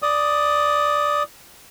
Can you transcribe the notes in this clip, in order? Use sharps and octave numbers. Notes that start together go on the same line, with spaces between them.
D5 D#6